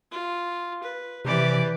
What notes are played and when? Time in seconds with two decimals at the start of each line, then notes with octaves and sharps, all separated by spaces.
0.11 F4
0.83 B4
1.25 C3 E3 G4 B4 D5